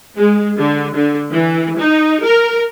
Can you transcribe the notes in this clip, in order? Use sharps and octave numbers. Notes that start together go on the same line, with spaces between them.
G#3
D3
D3
E3
D#4
A#4